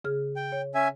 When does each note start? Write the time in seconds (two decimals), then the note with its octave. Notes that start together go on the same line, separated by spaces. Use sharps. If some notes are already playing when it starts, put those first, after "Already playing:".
0.04 C#3 G#4 F6
0.36 G5
0.52 C#5
0.75 C#4 E5 G#5